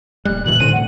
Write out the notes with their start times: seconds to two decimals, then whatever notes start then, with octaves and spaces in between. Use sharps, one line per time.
0.25 D#1 G3 F#6
0.46 A#2 D#3 E3 F#7
0.60 A2 D3 C4 D#7
0.73 F#5